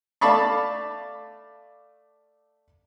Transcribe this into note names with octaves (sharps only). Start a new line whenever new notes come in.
A3 D5 F5 A5 B5 C#6